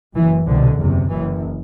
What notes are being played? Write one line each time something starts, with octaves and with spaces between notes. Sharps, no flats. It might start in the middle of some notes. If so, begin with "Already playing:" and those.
F#1 F#2 E3
C2 B2 D3
F#1 E2 C3
F#1 F#2 E3